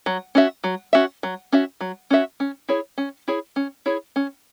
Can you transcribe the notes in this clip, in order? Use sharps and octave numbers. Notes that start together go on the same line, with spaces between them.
F#3
C#4 F#4 E5
F#3
C#4 F#4 E5
F#3
C#4 F#4 E5
F#3
C#4 F#4 E5
C#4
E4 G#4 C#5
C#4
E4 G#4 C#5
C#4
E4 G#4 C#5
C#4